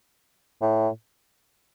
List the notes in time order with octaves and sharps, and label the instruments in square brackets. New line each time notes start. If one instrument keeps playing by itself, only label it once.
[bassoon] A2